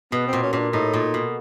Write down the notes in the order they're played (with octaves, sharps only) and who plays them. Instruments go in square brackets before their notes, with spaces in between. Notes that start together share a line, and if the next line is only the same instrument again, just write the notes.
[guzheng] B2 [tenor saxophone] B3
[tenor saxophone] C4
[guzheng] A#2
[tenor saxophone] C#4
[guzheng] A#2 [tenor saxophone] C#4
[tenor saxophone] D4
[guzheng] A2 [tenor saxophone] D#4
[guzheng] A#2
B2